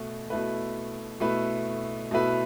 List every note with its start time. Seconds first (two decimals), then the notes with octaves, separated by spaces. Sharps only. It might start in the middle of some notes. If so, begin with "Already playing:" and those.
Already playing: B2 A3
0.30 B2 A3 E4 B4
1.20 B2 A3 E4 B4
2.11 B2 A3 E4 B4